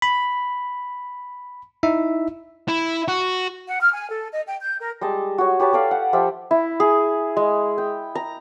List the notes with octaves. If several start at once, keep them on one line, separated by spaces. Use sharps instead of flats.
B5
D#4 E4 E5
E4
F#4
F#5
F6
G#5
A4
D#5
G5
G6
A#4
G3 G#3 D#5 A5
F#4 C#5
G4 B4 C#5 A5
G4 A4 D5 F5
F#5
F3 F4 G4 E5
E4
G#4
G#3
G5
A#5